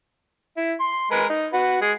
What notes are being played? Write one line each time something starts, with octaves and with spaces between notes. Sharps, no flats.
E4
C6
G#3 A#4 B4
D#4
F#4 B4
G#3 G#4